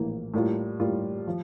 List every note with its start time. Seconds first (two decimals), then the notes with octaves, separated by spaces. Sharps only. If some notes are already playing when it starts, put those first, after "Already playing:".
Already playing: A#1 A2 E3 A#3
0.34 A2 G3 A#3 F4
0.80 A2 G3 A#3 F4
1.27 F3